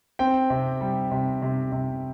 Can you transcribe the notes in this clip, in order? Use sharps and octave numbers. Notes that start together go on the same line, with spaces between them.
C4 G5
C3
G3
C3
C3
C3